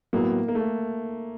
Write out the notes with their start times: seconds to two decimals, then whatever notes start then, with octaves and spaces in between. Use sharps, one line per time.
0.13 A2 F#3 A#3 B3
0.48 A#3
0.55 A3